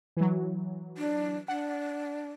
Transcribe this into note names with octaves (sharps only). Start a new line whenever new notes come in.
E3 F#3
D4
D4 F#5